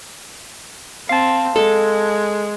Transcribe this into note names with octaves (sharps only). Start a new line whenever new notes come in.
C4 F5 A5
G#3 A4